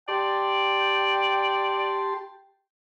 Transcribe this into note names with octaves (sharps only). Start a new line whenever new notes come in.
G4 D5 G5 A5 C6